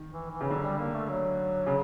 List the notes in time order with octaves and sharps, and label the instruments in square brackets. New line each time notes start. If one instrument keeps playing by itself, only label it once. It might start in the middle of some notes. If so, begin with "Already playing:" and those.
Already playing: [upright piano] D#3
[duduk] E3
E3
[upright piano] C#3
[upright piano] D3 [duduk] F#3
[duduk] G3
A#3
A3
F#3
[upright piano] C#3